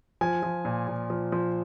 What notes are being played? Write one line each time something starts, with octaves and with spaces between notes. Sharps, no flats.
F3 G#5
F3
A#2
A#2
F3
F3